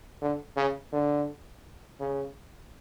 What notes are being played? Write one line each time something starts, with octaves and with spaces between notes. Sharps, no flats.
D3
C#3
D3
C#3